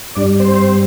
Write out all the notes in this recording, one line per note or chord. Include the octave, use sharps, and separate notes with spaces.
G2 G3 D4 D5
C4 C5